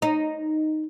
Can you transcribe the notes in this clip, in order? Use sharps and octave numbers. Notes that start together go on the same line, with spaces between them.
D#4